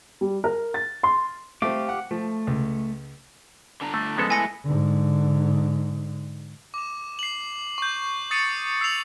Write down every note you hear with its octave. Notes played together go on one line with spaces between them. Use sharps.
G3
A#4
A6
C6
A3 C4 G4 F5 D6
F#5
F3 A3
C#2
D3 D4 A#5
A3
F3 G#3 B3 C#4 A4
A3 E4 G#5 A#6 C#7
G#2 D3
D6 E7
C7 F#7
C#6 G6
D#6 A6 C7 C#7 D#7
E6 C7 C#7 F7 F#7